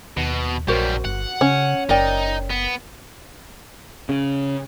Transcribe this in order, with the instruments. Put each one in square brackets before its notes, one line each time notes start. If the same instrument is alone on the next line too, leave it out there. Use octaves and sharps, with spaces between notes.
[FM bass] D#2 [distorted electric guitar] B2
[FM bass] A#1 [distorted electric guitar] F#2 G3 [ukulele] F#4 A#4 C5
[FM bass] G1 [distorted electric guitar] F#5
[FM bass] C#3 [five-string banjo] C#4
[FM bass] F#1 [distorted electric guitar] D#4 [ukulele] A#4 D5 G5
[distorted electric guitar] B3
[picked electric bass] C#3